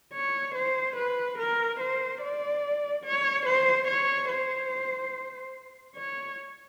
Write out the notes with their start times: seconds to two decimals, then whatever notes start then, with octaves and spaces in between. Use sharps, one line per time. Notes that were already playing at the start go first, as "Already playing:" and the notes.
0.13 C#5
0.55 C5
0.96 B4
1.38 A#4
1.80 C5
2.21 D5
3.05 C#5
3.46 C5
3.88 C#5
4.30 C5
5.96 C#5